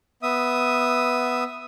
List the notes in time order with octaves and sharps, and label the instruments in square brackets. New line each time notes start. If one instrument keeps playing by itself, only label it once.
[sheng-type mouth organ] B3 E5 D#6